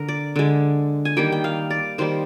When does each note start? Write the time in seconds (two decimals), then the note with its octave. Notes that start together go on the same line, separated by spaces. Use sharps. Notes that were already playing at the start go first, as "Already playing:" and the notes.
Already playing: D3 A#4
0.08 D5
0.36 D3 G#3
1.05 G#5
1.17 D#3 G3 A#3 G5
1.32 G5
1.44 F5
1.70 D5
1.98 D#3 G3 A#3 C5